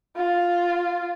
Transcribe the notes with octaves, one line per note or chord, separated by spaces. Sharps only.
F4